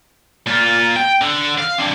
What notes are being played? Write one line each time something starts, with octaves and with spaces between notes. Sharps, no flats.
A#2 F4
G5
D3
F5
C4 D4